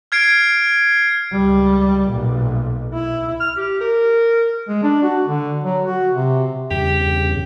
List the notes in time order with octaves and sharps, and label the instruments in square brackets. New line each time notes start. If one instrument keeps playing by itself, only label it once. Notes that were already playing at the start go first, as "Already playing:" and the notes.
[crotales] F6 G#6 C7 D7
[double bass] C#2 G3
B1 A#2
E4
[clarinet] F6
G4
A#4
[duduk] G#3
D4
F#4
D3
F#3
F#4
C3
[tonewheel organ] E2 G2 C#3 [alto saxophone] G4